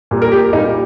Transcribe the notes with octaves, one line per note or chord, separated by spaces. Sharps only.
A#2 G3 A#3
A#4
G4
A#2 G3 A#3 D#4